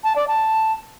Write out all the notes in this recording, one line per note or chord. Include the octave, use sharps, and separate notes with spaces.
A5
D5
A5